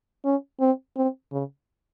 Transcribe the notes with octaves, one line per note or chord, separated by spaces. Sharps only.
C#4
C4
C4
C#3